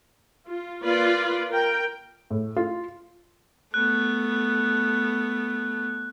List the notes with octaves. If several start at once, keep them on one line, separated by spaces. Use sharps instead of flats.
F4
A#3 F4 B4 D5
A#4 G5
A2
F4
A3 B3 F#6